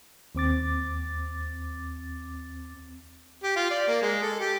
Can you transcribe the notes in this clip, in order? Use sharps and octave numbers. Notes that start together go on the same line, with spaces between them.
D#2 C4 D6 A6
G4
F4
D5
A#3
G#3
A4
G4